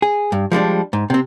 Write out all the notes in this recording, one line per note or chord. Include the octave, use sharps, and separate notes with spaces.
G#4
G2
F3 G3 G#3 D4
G#2
C3 C4